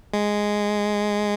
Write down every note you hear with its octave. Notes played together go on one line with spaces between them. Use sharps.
G#3